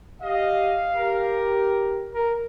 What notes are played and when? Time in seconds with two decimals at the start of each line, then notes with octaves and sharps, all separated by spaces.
0.22 G4 D#5 F5
0.95 G4 A#4
2.14 A#4